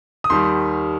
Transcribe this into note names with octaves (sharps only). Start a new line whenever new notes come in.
D#6
D#2 D#3 G3 C6